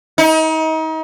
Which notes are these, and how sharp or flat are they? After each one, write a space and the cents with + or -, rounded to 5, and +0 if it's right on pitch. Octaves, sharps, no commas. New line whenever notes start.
D#4 +35